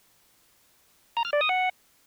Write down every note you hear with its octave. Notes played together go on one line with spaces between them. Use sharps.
A#5
F6
D5
D#6
F#5